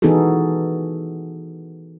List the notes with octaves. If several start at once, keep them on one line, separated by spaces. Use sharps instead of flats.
E3 B3 D#4 F#4 G#4 A4